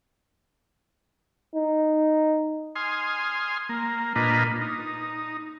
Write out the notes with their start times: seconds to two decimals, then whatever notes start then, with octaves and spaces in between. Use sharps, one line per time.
1.54 D#4
2.76 G#5 C6 D#6 F6
3.69 A#3
4.16 A#2 A#3 D4 F4 B4 D#5
4.62 D#4